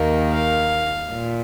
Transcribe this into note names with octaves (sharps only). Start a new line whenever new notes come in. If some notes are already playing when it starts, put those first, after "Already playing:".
Already playing: D#2 D#3 A#3
F5
A#2